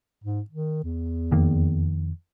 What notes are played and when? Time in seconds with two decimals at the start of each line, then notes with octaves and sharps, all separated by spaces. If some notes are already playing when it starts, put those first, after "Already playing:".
0.24 G#2
0.50 D#3
0.84 E2
1.31 F2 D#3 A#3